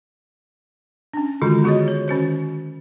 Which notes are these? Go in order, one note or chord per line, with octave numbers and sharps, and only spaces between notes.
C#4 D4
D3 D#3 G#3 F4 F#4
B3 F#4 G#4 C#5 D#5
C#5
D#3 C#4 F#4 C5